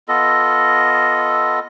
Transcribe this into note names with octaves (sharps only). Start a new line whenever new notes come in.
B3 F4 A4 D#5